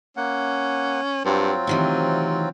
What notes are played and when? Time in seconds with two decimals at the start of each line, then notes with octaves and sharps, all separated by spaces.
0.17 A#3 C#4 F#5
1.25 G2 F#3 C4 F4
1.67 A2 C3 D#3 E3